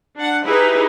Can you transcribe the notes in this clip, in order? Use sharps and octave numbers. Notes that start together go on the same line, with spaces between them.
D4 F#5
D#4 E4 G4 G#4 B4